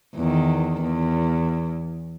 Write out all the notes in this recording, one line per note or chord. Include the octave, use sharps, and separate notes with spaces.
E2 D#3
E2